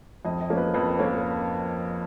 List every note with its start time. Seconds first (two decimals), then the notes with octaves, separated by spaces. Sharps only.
0.25 F2 D#5
0.41 D#5
0.50 F3 A#3 C#4
0.57 B4
0.74 F2 B4
0.99 F3 A#3 C#4 C#5